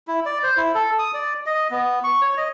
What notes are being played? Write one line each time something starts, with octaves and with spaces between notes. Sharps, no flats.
E4
D5
C5
E4
A4
D#6
D5
D#5
B3
C#6
C#5
D#5